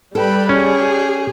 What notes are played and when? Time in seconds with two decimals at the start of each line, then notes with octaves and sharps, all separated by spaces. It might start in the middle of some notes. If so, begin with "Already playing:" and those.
0.15 G3 A4 B4 G5 B5
0.49 C#4 G4 G#4